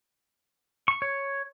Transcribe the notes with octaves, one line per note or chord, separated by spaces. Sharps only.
C#6
C#5